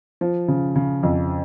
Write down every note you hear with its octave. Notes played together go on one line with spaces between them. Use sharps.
F3
C#3
C#3
F2